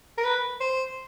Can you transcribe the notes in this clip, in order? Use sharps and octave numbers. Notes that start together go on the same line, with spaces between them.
A#4
B4
C5